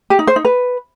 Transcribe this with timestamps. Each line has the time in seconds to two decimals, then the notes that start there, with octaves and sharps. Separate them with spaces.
0.10 G4
0.19 D#4
0.27 C5
0.36 D#4
0.45 B4